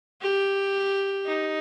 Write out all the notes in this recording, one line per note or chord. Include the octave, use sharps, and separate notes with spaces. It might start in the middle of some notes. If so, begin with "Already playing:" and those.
G4
D#4